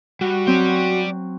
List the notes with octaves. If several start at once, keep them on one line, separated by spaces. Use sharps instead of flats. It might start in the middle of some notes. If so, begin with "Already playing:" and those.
G3 F#4
F#3 C4 D5 G5